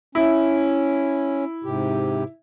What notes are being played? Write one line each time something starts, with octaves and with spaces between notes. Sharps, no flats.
C#4 E4
G#2 C3 G4